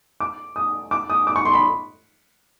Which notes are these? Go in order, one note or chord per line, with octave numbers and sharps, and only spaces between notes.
D6
D#6
D6
D#6
D6
C#6
C6
B5